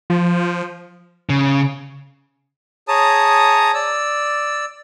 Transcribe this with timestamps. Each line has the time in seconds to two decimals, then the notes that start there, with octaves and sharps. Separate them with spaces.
0.10 F3
1.29 C#3
2.88 G#4 C#5 A5 A#5 D#6
3.74 D5 E6